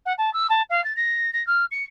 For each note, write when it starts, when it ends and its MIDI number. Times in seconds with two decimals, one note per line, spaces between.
0.06 0.13 78
0.18 0.33 81
0.33 0.47 88
0.50 0.62 81
0.70 0.83 77
0.84 0.93 93
0.96 1.33 94
1.33 1.45 94
1.47 1.65 89
1.71 1.84 97